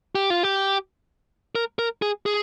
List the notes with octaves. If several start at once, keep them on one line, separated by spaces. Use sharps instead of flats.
G4
F4
G4
A#4
A#4
G#4
G#4